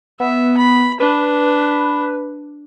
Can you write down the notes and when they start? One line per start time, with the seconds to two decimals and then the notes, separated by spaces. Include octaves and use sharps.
0.20 B3 E5
0.57 B5
1.00 D4 B4